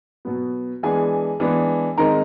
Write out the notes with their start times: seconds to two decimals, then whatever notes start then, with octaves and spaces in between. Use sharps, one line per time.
0.25 B2 F#3 B3
0.83 E3 G#3 B3 D4 G#4 G#5
1.40 E3 G#3 B3 D4
1.97 D#3 G#3 C4 D#4 A#4 A#5